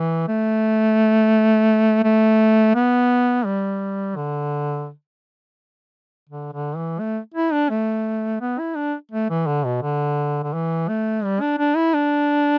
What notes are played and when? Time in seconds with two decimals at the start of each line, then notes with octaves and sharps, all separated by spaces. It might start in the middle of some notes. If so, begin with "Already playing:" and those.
Already playing: E3
0.28 A3
2.04 A3
2.75 B3
3.45 G3
4.16 D3
6.29 D3
6.53 D3
6.76 E3
7.00 A3
7.34 E4
7.52 D4
7.69 A3
8.41 B3
8.59 E4
8.75 D4
9.11 A3
9.30 E3
9.47 D3
9.65 B2
9.82 D3
10.43 D3
10.53 E3
10.89 A3
11.24 G3
11.41 D4
11.58 D4
11.76 E4
11.94 D4